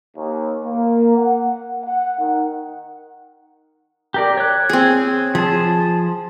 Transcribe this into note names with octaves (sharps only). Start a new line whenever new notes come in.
D#2
A#3
F#5
F#5
D#3
G4 A#4 D5
C#5 F#6
C4 G#4
F3 G#4 A5